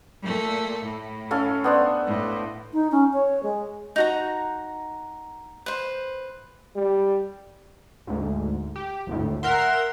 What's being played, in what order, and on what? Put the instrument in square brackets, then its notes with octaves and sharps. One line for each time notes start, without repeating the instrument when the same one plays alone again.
[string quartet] A#2 A3
A2
[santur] C#4 A4 F5
B3 D4 C5
[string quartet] A2
[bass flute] D#4
C#4
C#5
G#3
[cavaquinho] D#4 F#4 A#5
B4 C5
[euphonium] G3
[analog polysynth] D2 G#2
G4
G#1 D2 A2
[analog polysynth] A#4 E5 C6 [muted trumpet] F#5